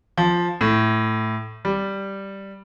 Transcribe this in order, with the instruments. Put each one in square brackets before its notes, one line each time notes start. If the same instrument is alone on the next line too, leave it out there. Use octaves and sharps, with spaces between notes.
[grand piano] F3
A2
G3